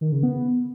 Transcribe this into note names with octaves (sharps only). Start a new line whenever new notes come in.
D#3
C#3
B3